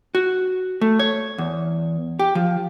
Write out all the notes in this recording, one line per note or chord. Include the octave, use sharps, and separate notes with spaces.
F#4
A3
C#5
E2
G4
F3